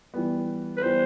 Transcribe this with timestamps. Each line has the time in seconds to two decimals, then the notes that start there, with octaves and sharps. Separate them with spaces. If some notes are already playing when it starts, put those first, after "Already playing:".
0.14 E3 G3 B3
0.77 B4
0.82 E3 G3 B3 C5